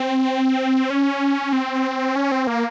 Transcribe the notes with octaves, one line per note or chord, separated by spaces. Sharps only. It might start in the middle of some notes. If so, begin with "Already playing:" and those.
Already playing: C4
C#4
C4
C#4
C4
A#3